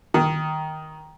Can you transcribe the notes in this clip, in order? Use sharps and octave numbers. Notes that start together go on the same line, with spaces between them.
D#3